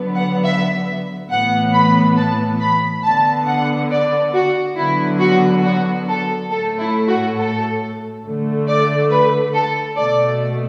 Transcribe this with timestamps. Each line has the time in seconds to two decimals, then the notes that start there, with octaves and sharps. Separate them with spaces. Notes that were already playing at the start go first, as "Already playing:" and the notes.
Already playing: D3 F#3 B3
0.15 F#5
0.44 E5
1.30 A2 E3 B3 F#5
1.73 B5
2.17 A5
2.60 B5
3.04 D3 B3 A5
3.47 F#5
3.91 D5
4.34 F#4
4.77 D3 F#3 B3 E4
5.20 F#4
5.64 F#4
6.07 A4
6.50 A2 A3 A4
6.80 E4
7.07 F#4
7.36 A4
8.24 D3 A3
8.67 D5
9.10 B4
9.53 A4
9.96 B2 A3 D5